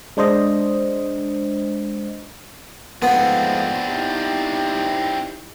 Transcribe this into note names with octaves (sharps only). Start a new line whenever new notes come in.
G#3 D4 C5 D#5
G#2 F3 A3 B3 C4 D4
D#4 E4 G4